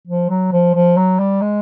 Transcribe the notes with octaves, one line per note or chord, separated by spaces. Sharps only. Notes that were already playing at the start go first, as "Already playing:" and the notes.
F3
F#3
F3
F3
F#3
G3
G#3